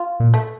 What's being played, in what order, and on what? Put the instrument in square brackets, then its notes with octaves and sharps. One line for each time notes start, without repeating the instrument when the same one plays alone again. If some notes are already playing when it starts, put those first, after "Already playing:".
Already playing: [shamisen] F4
[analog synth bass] A#2
[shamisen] A3